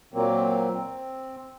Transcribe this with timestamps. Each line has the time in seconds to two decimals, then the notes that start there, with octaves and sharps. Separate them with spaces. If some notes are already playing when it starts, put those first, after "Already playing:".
0.14 A#2 F#3 A#3 C4
0.73 C4